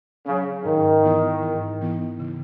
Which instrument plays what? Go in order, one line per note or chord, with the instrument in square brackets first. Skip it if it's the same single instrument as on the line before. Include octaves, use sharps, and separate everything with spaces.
[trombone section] C#3 [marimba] F#3 C#4
[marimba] G#2 [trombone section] D#3
[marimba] E3 B3 E4
G#2
E3 B3 E4
C#3